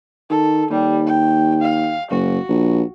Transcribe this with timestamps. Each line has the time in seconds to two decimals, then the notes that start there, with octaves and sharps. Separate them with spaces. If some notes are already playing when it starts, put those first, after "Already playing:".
0.30 D#3 A4
0.70 D#2 G3
1.06 G5
1.62 F5
2.10 F#1 F#4
2.49 A#1